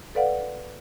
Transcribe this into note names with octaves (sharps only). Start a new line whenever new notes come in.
A4 B4 D5 F5 F#5